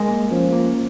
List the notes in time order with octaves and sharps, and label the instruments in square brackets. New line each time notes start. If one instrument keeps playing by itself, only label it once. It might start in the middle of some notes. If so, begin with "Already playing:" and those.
Already playing: [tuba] G#3 [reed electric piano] A#4
[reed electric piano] A#3
[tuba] F3 [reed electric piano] C#4
[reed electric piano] A#3